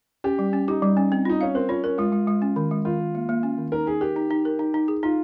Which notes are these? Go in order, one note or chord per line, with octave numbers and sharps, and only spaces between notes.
C#4 G4
G3
C#4
D#4 G4
G3
C#4
C4
D#4 F4
C#4 F5
C4 A#4
C#4 F4
C#4 A#4
G#3 F4
G#3
G#3
C#4
D#3
G#3
D#3 F4
D#3
A#3
A#3
C#4
D#3
D#4 A#4
D#4 G#4
G4 A#4
D#4
D#4
A#4
D#4
D#4
G#4
D#4 F4